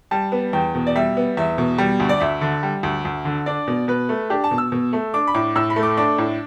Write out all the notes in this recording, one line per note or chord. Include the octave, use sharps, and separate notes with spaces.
G3 A5
B3
E2 G5
B2
D5
G3 E5
B3
E2 E5
B2
G3
D2
D5
D2 E5
D3
G3
D2
D2
D3
D4 D5
B2
B2 B4
A3
D4 G4
A5
B2
E6
B2
A3
D4 D6
B5
A2 D6
A2 E6
B5
A3
D6
D4 D6
A2